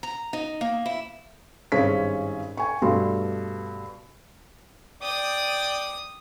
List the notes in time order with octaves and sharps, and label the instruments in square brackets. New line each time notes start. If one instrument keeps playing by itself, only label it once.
[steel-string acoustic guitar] A#5
D#4
A#3
E4
[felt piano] G#1 G2 C4 C#4 G#4 B6
G5 G#5 C#6
G2 B2 A3 C6
[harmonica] D5 G5 [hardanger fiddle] D#6